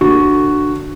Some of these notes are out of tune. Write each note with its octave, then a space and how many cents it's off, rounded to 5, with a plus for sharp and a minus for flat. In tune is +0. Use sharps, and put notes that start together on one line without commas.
D3 +15 F#4 +0